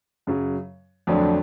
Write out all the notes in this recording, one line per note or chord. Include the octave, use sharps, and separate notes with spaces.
F#2 C#3 F#3
F2 D3 F#3 A3 D4